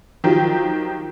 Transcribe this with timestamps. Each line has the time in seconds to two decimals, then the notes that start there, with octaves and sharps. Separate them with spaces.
0.24 D#3 F3 F#3 G4